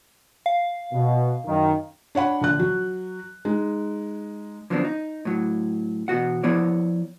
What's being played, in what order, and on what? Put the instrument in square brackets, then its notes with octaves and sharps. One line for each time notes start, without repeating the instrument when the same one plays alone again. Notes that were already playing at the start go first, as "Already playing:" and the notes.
[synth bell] F5
[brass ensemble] B2
F#2 D#3
[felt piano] D4 C#5 F#5 B5
A#1 D3 F#6
F#3
G#3 D#4
[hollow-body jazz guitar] D3 F3 F#3 B3 C4 D4
D#4
A2 F#3
E2 B2 F#4 F#5
F3 B3 E4 C#5 D5